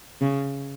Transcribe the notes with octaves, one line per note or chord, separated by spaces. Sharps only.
C#3